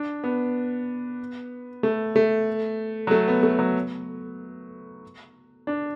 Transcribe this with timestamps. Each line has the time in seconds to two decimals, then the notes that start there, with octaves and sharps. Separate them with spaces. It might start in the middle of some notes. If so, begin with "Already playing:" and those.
Already playing: D4
0.24 B3
1.83 A3
2.16 A3
3.07 F#3
3.11 A3
3.28 B3
3.43 A3
3.59 F#3
5.67 D4